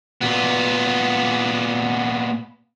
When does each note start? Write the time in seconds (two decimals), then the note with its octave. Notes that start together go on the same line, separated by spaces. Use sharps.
0.21 A#2 B3